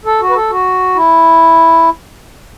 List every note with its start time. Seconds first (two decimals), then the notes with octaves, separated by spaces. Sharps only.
0.05 A4
0.21 F#4
0.29 B4
0.35 A4
0.50 F#4
0.95 E4